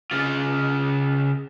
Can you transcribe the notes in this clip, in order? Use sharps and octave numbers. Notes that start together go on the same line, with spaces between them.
C#3 F4